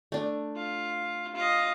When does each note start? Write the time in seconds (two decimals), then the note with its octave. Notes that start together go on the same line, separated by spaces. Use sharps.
0.12 A3 D4
0.56 F4
1.35 F4 D#5